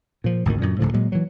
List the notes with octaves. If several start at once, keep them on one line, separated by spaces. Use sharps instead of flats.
A#2 F3
G#1 D2 A#2 D#3
F#2 A#2 D3
D1 A2 D3 F3
A#2 F#3 G#3
E3 F#3